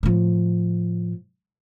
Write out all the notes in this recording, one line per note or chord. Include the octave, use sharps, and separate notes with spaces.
A2 F3